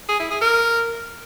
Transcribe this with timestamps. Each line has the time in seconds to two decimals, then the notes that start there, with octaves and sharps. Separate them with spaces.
0.09 G#4
0.20 E4
0.31 G#4
0.42 A#4